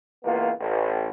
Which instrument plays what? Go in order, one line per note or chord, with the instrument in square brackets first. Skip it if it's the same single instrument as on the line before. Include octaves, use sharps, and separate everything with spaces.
[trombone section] C#2 E3 A#3 B3 F4
A1